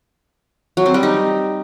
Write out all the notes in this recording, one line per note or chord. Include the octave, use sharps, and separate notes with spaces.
F#3
C4
G3
D#4